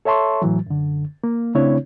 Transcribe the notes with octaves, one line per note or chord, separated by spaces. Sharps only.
A4 C#5 E5 A5 C6 C#6
A2 E3 F#3
F#2 D3
A#3
C#3 A3 C4 D4 E4 C#5